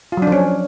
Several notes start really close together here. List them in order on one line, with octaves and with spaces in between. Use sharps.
F4 F#3 D4 F3 C#4